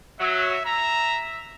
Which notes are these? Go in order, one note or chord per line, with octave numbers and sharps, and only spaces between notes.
F#3 E5
E5 A#5